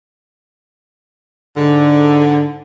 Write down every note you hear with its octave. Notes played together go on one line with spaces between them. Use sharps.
G#2 D3